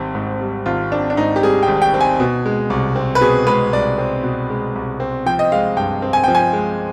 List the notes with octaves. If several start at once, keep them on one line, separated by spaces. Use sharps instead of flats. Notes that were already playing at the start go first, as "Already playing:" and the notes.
Already playing: G#1 G3 C4
G#2
G3
G#1 F4
C4 D4
D4
G#2 D#4
G4
G3 G#4
G5
G#1
G5
C4
G#5
B2
G#3
C2
C4
B4
B2 G#4
G#3 B4
C2 D5
C4
B2
G#3
C2
C4
F3 G5
D#5
G#3 F5
G2 G5
C4
G#5
F3 G5
G#5
G#3